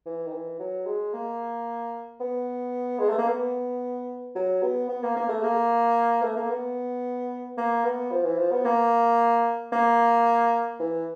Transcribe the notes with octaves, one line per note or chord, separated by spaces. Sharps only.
E3
D#3
E3
F#3
G#3
A#3
B3
G#3
A3
A#3
B3
F#3
B3
B3
A#3
A#3
A3
A#3
A3
A#3
B3
A#3
B3
F3
E3
F3
B3
A#3
A#3
E3